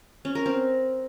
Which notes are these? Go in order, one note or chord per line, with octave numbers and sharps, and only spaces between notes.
C#4
A#4
C4